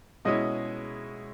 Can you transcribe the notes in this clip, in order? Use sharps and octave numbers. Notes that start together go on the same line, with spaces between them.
B2 G#3 C#4 E4 D#5